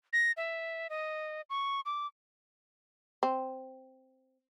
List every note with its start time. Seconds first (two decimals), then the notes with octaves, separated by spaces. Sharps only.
0.13 A#6
0.37 E5
0.90 D#5
1.50 C#6
1.86 D6
3.23 C4